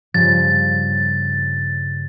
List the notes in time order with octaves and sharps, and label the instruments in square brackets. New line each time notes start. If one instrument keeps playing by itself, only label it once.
[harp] G2 C#3 [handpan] F3 [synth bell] A6